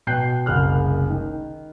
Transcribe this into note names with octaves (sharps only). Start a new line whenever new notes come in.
B2 G5 F#6 G6 C7
F#1 C2 G#4 F6 F#6
D#3